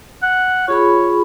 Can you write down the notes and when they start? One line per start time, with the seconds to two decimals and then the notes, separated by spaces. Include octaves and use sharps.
0.23 F#5
0.68 F4 G#4 C#5 B5